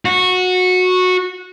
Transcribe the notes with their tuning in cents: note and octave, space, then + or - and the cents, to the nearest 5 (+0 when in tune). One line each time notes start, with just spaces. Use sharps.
F#4 -15